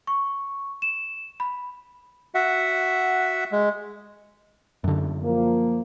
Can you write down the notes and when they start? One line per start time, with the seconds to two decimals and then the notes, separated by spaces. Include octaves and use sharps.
0.07 C#6
0.82 E7
1.40 B5
2.35 F#4 E5 F#5
3.52 G#3
4.84 F#2 D3
5.23 F3 A#3